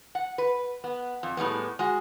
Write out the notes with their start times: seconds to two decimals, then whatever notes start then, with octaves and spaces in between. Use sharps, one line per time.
0.15 F#5
0.38 B4
0.84 B3
1.23 F2
1.37 A2 G3 G#3 B3
1.79 G#3 F#4